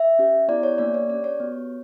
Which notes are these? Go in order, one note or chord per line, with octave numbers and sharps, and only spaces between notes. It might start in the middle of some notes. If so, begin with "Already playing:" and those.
Already playing: E5
C#4 G4
B3 E4 G4 D5
C#5
A#3 D4 G4 D5
C#5
C#4 G4 D5
C#5
B3 F#4